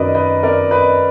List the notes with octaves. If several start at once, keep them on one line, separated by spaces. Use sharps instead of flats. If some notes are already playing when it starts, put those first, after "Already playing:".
Already playing: F#2 D#3 F#3 A#4 B4 D5 D#5
B4 D#5
A#4 D5
B4 D#5